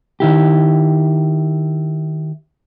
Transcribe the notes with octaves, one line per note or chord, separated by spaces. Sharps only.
D#3 E4 G4